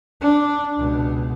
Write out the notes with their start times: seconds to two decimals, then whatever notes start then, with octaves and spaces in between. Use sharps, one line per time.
0.21 D4
0.77 C#2 B2